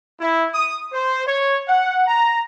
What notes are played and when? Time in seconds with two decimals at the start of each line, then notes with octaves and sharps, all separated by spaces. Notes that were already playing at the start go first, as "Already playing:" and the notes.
0.21 E4
0.54 D#6
0.92 C5
1.26 C#5
1.69 F#5
2.07 A#5